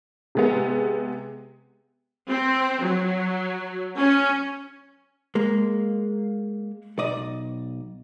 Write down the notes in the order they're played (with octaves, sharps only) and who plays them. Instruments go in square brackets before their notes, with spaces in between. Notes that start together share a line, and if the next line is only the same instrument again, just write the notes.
[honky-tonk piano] C3 G#3 B3
[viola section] C4
F#3
C#4
[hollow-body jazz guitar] G#3 A#3
B1 D5 D#5